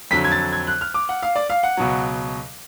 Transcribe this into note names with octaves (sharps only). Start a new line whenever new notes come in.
F2 D3 F#3 B6
G#6
A6
G#6
F#6
F6
D6
F#5
F5
D5
F5
F#5
C#2 B2 F#3